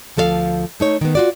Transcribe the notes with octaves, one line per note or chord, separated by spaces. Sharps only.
D2 F3 A4 A#4 F5
A3 D#4 C#5
D#3 B3
F4 F#4 D5